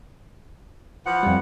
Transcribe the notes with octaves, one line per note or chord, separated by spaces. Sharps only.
E3 F3 F#5
F2 G3